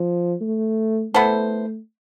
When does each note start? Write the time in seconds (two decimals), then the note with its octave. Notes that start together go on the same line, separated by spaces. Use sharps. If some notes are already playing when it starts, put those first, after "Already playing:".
Already playing: F3
0.41 A3
1.13 A3 B3 E4 A4 C5